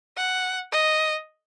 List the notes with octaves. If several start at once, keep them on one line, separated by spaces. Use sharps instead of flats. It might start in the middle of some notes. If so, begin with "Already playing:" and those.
F#5
D#5